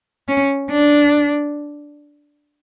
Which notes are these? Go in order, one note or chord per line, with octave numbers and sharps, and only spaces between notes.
C#4
D4